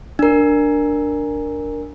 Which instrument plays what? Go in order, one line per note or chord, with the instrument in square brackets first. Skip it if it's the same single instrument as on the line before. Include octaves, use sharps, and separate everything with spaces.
[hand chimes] D4 A#4